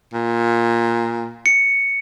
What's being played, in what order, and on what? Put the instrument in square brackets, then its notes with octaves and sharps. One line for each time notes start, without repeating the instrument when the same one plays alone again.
[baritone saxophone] A#2
[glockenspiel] C#7